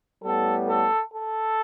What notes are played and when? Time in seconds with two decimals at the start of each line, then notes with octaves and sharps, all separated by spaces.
0.24 A2 G3 B3 A4
0.69 A4
1.15 A4